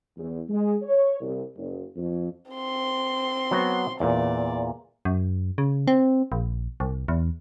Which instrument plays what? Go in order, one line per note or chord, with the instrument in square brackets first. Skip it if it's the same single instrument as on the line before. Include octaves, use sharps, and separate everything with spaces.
[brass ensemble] E2
G#3
C#5
C2
F#1
F2
[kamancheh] C4 C6
[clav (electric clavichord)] F#3 B3 F#4
[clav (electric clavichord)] E2 A#2 [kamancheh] D5
[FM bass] F#2
C#3
C4
A#1
C2
E2